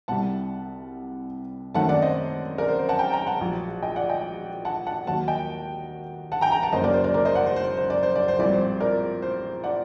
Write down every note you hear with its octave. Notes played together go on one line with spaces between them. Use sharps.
C2 C3 G3 F#5 A5
F#2 D#3 A3 C4 F#5 A5
D5 F#5
C5 D#5
A#4 D5
C5
C5
F#5 A5
G5 A#5
G5 A#5
F#5 A5
A#1 A2 F#3
D#5 G5
D5 F#5
D#5 G5
F#5 A5
F#5 A5
D#2 D#3 F#3 A#3 F#5 A5
D#5 G5
F#5 A5
G5 A#5
G5 A#5
F#5 A5
F#1 F#2 F#3 A#3 C5 D#5
A#4 D5
C5
A#4 D5
A#4 D5
C5 D#5
D5 F#5
C5
C5
C5
D5
C5
D5
C5
A#1 A2 G3 C4 D5
C5
A#4 D5
C5
D5 F#5